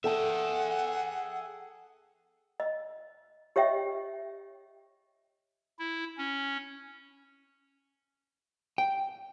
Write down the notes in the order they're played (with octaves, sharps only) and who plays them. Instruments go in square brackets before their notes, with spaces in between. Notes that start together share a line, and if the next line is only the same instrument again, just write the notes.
[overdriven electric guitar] G#4 E5 [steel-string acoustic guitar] A4 G5 A5 [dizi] F#5
[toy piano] D#5
G4 C#5 D#5 E5 G5
[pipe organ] E4
C#4
[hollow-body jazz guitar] G5